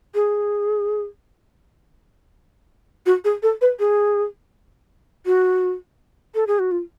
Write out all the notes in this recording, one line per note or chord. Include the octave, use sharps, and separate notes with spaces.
G#4
F#4
G#4
A4
B4
G#4
F#4
A4
G#4
F#4
F4